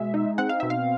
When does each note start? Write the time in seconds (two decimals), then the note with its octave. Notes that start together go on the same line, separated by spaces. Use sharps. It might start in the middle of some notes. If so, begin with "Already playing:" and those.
Already playing: B2 G#3 E5
0.14 D#4
0.38 C4 F#5
0.49 F5
0.60 B2 E5
0.70 F5